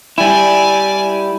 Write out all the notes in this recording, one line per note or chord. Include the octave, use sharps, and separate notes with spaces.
G3 E4 D5 G#5